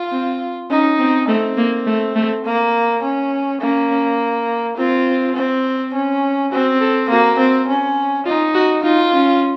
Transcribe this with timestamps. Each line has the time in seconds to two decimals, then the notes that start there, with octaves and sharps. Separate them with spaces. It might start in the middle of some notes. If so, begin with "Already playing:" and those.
Already playing: F4
0.12 C4
0.70 C#4 D#4
0.99 C4
1.28 A3 C4
1.57 A#3
1.87 A3
2.16 A3
2.45 A#3
3.03 C#4
3.61 A#3 C#4
4.77 C4 F4
5.36 C4
5.93 C#4
6.52 C4 F#4
6.81 A4
7.10 A#3 F#4
7.39 C4
7.68 C#4
8.26 D#4 F4
8.55 F#4
8.84 D#4 F4
9.13 C#4